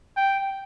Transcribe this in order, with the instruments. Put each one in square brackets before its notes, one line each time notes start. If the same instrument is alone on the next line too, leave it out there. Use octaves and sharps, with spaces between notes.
[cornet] G5